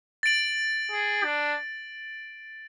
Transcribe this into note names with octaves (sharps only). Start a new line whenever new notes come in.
A6 D7 F#7
G#4
D4